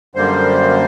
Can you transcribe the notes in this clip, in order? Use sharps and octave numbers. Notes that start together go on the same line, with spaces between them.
F#2 D3 G3 A#3 C5